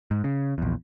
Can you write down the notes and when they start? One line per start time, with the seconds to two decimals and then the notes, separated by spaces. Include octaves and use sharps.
0.11 G#2
0.24 C#3
0.58 A#1 E2